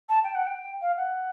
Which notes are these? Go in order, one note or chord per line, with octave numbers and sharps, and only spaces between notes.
A5
G5
F#5
G5
F5
F#5